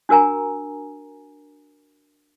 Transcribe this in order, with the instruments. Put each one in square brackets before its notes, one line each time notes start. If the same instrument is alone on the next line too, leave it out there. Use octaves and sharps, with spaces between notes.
[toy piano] D4 F#4 A#4 G#5 A#5